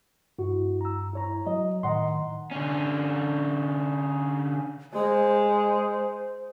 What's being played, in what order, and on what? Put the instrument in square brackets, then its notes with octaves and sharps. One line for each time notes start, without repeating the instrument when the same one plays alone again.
[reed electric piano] G2 [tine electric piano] E4 F#4
[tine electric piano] A#5 E6
E4 C#5 A#5
[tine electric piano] F#3 [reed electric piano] D#5
[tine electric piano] A2 D#3 A#5 [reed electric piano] D#5 F#5 C6
[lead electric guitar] D3 C#4
[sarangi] G#3 [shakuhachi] C5